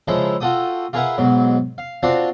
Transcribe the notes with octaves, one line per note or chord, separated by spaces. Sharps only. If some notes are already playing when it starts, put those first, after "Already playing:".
C#3 F3 G#3 E4 A4 A#5
F4 F#4 A4 G5 D#6
F4 G#4 A#4 B4 E5 F#5
B1 G#2 F#3
F5
C4 D4 F4 F#4 F5 A5